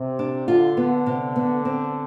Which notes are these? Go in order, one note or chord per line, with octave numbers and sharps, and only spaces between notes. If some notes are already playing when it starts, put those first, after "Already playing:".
Already playing: C3
D4
D3 F4
B3
C3
B3
C4